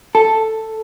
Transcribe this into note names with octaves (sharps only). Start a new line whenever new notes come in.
A4